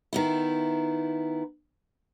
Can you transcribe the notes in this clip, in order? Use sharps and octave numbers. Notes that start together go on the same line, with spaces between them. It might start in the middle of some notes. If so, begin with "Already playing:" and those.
D#3 B3 E4